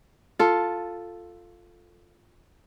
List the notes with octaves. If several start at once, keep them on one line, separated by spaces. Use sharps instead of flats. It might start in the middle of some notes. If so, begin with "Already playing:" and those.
F4 A4